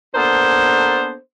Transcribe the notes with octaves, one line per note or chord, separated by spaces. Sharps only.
A#3 B3 D4 A4 C5